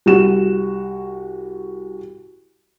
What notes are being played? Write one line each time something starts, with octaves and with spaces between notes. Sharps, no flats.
C2 F#4 E7